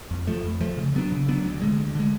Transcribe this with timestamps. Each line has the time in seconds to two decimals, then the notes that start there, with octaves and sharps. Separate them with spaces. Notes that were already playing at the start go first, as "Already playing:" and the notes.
0.11 F2
0.27 F3 A3
0.44 F2
0.61 F3 A3
0.77 C#3
0.95 F#3 B3 D4
1.12 C#3
1.29 F#3 B3 D4
1.45 D2
1.62 D3 G#3
1.79 D2
1.95 D3 G#3